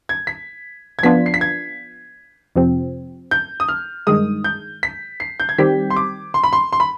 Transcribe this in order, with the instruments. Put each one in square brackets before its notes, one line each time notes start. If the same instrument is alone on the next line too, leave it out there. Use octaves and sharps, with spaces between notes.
[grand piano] G#6
B6
G#6
[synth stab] F3 B3 D4 F4 [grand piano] B6
[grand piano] C7
B6
G#6
[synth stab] F2 C3 F3 C4
[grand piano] G6
D#6
F6
[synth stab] G2 D#3 G#3 [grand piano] D#6
[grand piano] G6
B6
C7
G6
G#6
[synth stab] D#3 G3 C4 G4 [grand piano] B6
[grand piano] C6
D6
C6
B5
C6
C6
B5